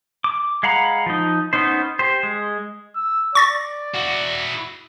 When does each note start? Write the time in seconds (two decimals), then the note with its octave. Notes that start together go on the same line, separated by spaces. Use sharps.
0.24 D6
0.63 G#3 F5 F#5 A#5 B5
1.06 F3 D#4
1.53 B3 C#4 D#4 C5
1.99 G4 C5
2.23 G#3
2.96 E6
3.35 D5 C#6 A6 A#6
3.95 E4 F#4